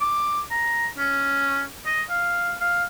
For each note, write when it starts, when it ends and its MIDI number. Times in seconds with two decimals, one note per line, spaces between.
0.01 0.41 86
0.51 0.87 82
0.98 1.62 61
1.86 2.02 75
2.10 2.54 77
2.61 2.84 77